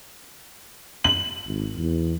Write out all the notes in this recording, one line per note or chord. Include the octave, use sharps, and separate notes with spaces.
F#7
G#1
E2